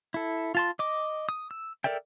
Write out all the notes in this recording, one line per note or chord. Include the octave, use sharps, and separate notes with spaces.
E4 A4
F4 A5 C6
D#5 D6
D#6
E6
A4 A#4 D5 E5 G5